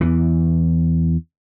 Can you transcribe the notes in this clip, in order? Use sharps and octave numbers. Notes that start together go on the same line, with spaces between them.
E2 E3